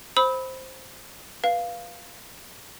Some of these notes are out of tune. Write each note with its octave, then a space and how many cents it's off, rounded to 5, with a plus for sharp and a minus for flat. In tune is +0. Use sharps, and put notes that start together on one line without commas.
C5 +0 B5 +0 E6 -35
B4 -20 F5 +0